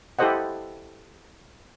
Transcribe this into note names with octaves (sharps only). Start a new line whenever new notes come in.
E4 G4 A4 C5 D#5 F#5